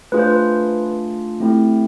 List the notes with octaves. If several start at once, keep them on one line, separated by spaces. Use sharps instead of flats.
A3 D4 F4 G#4 B4
C5
B4
A3 C4 E4 G4